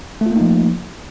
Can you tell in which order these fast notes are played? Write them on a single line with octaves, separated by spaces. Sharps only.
A3 F4 A#3 D#4 F3